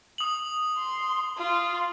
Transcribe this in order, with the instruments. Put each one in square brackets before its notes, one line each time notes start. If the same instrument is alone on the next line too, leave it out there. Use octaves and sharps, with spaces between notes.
[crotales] D#6 F#7
[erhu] C6
F4